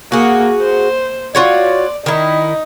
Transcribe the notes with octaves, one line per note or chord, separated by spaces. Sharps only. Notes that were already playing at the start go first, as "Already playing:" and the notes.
A#3 F#4 G#4
C5
F4 F#4 C#5 D5
D#3 D#4 E4